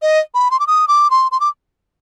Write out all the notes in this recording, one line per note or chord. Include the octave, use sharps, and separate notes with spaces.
D#5
B5
C6
D6
D#6
D6
C6
C6
D6